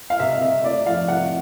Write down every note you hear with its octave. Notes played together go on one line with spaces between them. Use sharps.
F5
C3 E5
D#5
C3 E5
A3 D5
F2 F5
C3 F#5